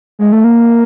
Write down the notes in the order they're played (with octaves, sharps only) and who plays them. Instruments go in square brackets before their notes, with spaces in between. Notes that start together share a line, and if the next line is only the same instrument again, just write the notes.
[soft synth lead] G#3
A3
A#3